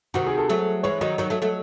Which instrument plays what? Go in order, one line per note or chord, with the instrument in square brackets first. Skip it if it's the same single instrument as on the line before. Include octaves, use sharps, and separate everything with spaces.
[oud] C3 D#3 [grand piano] F#4
[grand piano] G#4
A4
[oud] F#3 A3
[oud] E3 G#3 [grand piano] C#5
[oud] D#3 F#3 [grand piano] D#5
[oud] D#3 F#3 [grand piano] C#5
[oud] F#3 A3
F#3 A3